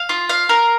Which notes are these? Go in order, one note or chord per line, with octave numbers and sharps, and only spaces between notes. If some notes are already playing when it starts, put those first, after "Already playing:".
Already playing: F5
F4
F5
A#4